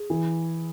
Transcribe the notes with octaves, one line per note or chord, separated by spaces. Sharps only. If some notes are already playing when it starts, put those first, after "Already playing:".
Already playing: G#4
E3